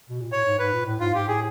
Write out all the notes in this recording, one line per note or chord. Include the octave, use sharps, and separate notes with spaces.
B2
A#2
A2 C#5
G#2
G#2 B4
A#2
A2
G#2 F4
G#2 G4
A2 G#4